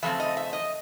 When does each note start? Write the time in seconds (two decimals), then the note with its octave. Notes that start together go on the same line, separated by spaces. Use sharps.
0.02 C#3 F3 A3 C4 E5
0.20 D#5
0.37 E5
0.53 D#5